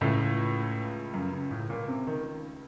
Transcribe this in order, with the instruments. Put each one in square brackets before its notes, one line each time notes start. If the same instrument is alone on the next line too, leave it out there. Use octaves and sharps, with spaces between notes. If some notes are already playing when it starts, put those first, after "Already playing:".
[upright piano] C#2 C#3 A3 [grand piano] A2
[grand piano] F#2
C#3
A2
A#2
C3
D#3